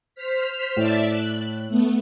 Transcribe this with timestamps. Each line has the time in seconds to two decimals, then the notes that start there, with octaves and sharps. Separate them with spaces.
0.15 C5 F6 B6
0.77 A2 D5 E5 A5
1.09 F#6
1.68 A3 B3